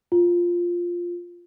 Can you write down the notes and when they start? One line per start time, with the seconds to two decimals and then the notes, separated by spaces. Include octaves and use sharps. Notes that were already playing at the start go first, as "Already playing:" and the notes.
0.12 F4